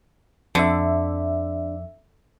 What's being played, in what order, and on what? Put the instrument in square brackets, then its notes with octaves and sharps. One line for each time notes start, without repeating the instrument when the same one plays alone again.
[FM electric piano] F2 E5 [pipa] D3